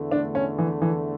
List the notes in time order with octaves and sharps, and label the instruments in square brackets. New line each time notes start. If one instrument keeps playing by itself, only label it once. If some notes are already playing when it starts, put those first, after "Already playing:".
Already playing: [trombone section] E2 D3 A3
[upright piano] D4
C#4
E3
E3